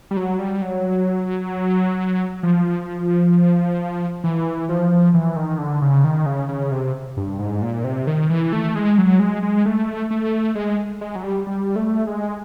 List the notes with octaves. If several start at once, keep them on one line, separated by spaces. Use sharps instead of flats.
G3
F#3
G3
F#3
F3
E3
F3
E3
D#3
D3
C#3
D#3
C#3
C#3
C3
G2
G#2
A#2
C3
D#3
E3
A3
G#3
F#3
G#3
G#3
A3
A3
G#3
G#3
F#3
G3
G3
A3
G#3